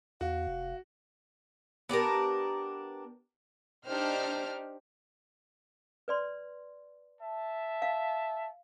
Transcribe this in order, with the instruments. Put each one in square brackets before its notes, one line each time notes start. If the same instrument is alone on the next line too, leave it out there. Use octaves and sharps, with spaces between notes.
[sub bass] E2 [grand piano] F#4 [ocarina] F5
[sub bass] F1
[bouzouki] B3 D4 G4 A#4
[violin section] D4 D#4 F6 [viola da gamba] G4 C5
[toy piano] B4 D5 C6
[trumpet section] E5 A5
[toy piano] F5